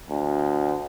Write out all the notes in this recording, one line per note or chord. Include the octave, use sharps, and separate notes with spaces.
D2